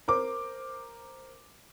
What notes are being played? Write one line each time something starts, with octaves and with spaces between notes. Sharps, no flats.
A#4 C5 D6